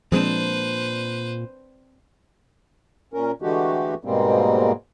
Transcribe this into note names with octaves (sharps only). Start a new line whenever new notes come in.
A#2 F3 G#3 C4 D4 B4 C5
A#2 C#4 A#4
D3 E3 G#3 A3 F#4 G4
G#2 B2 G3 G#3 A#3 C4